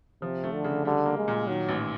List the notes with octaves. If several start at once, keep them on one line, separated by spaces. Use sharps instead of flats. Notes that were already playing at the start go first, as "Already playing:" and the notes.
C3 F3
A3
D3
C#3
D3 G3
A#3
G#3
A#2
D#3 F#3
A1